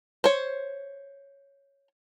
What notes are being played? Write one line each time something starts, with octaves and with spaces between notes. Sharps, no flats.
C5 C#5